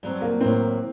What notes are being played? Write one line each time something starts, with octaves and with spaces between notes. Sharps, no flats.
G2 F#3 C4
A#3
A2 F#3 A#3 C4